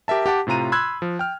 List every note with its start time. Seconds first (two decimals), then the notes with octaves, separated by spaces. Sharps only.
0.08 G4 A#4 E5 A5
0.26 G4 F#5 A5 D6
0.47 A2 C3 F4 A#5 D#7
0.72 B5 C6 E6 F#6 G#6
1.02 F3
1.19 G5 F6